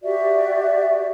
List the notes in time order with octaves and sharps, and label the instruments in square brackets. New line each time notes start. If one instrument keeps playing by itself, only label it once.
[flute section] F#4 G4 D5 E5